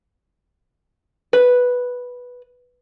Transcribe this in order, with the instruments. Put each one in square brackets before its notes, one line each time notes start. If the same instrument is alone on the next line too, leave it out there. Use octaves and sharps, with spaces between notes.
[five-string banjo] B4